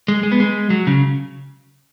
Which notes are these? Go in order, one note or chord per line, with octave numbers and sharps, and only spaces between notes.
G#3
G#3
B3
G#3
F#3
C#3